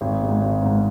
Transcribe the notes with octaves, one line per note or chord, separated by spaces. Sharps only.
G#1
G#2 G#3
G#1
G#2 G#3